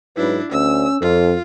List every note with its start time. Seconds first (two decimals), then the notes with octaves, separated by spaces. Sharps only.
0.17 G#2 F#3 D4 E4 B4
0.52 D2 C#4 E6
1.01 F2 F4 A4